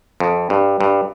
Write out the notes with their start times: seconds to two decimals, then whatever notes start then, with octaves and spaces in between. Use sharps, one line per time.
0.20 F2
0.50 G2
0.81 G2